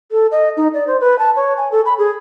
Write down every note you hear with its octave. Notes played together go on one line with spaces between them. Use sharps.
A4
D#5
D#4
D5
C5
B4
A5
C#5
G#5
A4
B5
G#4